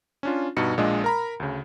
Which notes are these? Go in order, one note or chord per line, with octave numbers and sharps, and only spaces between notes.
C#4 D4 F4
G2 B2 D#4 C#7
A#1 A#2 G#3 D4 D#5
A#4 A#5 B5
D2 C#3